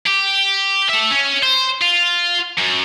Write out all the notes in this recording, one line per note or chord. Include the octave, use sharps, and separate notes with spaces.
G4
A4 E5
C#4
C5
F4
F#2